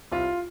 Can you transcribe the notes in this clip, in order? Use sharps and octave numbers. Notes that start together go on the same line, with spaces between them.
C2 F4